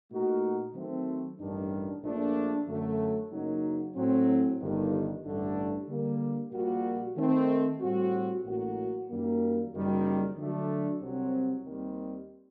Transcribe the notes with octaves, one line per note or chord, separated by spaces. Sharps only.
A#2 A3 D#4 F#4 A#4
D#3 F#3 A3 C4
A1 G2 D#3 G3 D4
A#1 A#2 A3 D4
F#2 D3 F#3 A3
F#1 F#2 F#3 A#3 D#4
A2 F#3 C4
G1 G2 D#3
A1 G2 D3 A3 D4
D3 G3 A#3
A#1 A#2 G3 A#3 F#4
D#3 A3 C4
A2 G3 C4 F#4
A1 A2 F#3 A#3 F#4
F#2 D#3 G3 A#3
F#1 F#2 D#3 G3
D3 F#3 A3 D4
C2 C3 F#3 C4
D#2 D#3 G3 C4